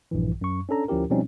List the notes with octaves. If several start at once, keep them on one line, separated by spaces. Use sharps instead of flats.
A#1 G2 E3
F#2 C#6
C#4 D4 A4 A#5
D2 F3 C#4 E4 G4 A#4
B2 F3 G3 C4 C#4 D#4